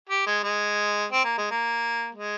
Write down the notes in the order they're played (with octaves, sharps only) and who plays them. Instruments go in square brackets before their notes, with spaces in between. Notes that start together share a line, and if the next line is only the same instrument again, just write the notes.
[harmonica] G4
G#3
G#3
C4
A#3
G#3
A#3
G#3